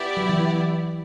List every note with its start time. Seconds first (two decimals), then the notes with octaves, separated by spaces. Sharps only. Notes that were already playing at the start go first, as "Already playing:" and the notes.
Already playing: B3 E4 G4 D5
0.17 F#3
0.29 E3